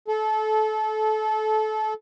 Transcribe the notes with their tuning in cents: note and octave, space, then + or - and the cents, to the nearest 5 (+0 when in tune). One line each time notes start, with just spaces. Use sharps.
A4 -25